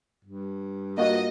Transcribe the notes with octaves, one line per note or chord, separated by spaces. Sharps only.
G2
A#3 F4 F#4 D#5